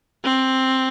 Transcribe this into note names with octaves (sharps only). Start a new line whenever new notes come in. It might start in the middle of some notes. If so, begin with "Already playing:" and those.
C4